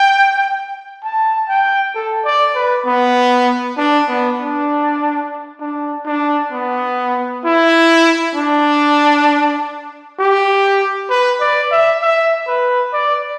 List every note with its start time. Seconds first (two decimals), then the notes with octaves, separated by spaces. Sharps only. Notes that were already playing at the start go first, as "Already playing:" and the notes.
Already playing: G5
1.04 A5
1.49 G5
1.95 A4
2.25 D5
2.55 B4
2.86 B3
3.77 D4
4.08 B3
4.39 D4
5.60 D4
6.06 D4
6.53 B3
7.45 E4
8.35 D4
10.19 G4
11.10 B4
11.41 D5
11.72 E5
12.02 E5
12.48 B4
12.93 D5